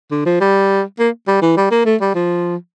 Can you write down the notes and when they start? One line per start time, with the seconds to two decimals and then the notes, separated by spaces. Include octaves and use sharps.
0.11 D3
0.26 F3
0.40 G3
0.99 A#3
1.27 G3
1.42 E3
1.57 G3
1.71 A#3
1.85 A3
2.01 G3
2.15 F3